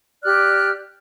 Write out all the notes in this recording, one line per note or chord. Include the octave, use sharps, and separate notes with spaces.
G4 D5 F6 F#6